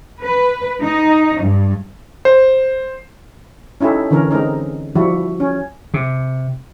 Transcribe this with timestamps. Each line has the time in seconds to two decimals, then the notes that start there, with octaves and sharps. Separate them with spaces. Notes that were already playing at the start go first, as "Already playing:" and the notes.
0.22 B4
0.82 D#4
1.42 G2
2.25 C5
3.81 C#4 D#4 E4 G4 A4
4.11 D3 E3 C#4 A#4
4.31 G#3 C4 D#4 A#4
4.95 F3 G3 E4 F#4
5.40 C#4
5.94 C3